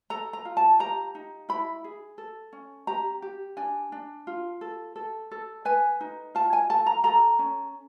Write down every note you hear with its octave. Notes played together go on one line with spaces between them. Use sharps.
A4 A#5
A#5
F4
A5
G4 A#5
D#4
E4 B5
G#4
A4
C#4
G4 A#5
G4
D4 G#5
D4
F4
A4
A4
A4
B4 G#5
D#4
F4 A5
G#5
A4 A5
A#5
A4 A#5
C#4